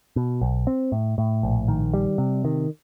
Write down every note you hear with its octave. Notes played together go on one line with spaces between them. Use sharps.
B2
B1
C4
A2
A2
A#1
D#3
G3
C3
D#3